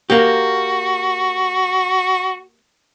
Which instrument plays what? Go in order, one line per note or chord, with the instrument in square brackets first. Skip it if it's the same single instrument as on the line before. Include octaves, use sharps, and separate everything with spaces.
[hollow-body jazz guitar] A#3 G4 [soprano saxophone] F#4